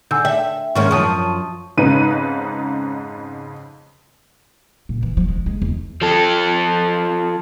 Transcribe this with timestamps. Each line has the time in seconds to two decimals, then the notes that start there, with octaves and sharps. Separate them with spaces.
0.11 D3 G#5 E6 G6
0.25 E5 G5
0.75 G#2 D#3 C#4 C#6
0.91 F#2 F3 C#6 D#6 D#7
1.78 F2 G#2 C#3 D#4 B4 D#7
4.89 A#2
5.03 E3
5.17 F3
5.29 G#3
5.46 G#3
5.62 E2
6.02 F3 A4